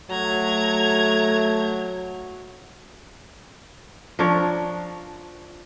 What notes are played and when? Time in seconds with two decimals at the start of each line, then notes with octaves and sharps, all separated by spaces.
0.10 F#3 A3 A#5 G#6
4.19 F3 D4 A#4 C#5